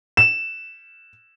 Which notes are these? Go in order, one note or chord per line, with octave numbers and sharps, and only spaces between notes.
E7